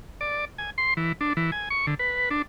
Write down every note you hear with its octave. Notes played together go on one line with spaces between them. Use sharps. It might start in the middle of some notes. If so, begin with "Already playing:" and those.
D5
G#5
C6
E3
D4
E3
G#5
C#6
D3
B4
D4